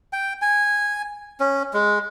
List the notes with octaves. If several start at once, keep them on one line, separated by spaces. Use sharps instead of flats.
G5
G#5
C#4
G#3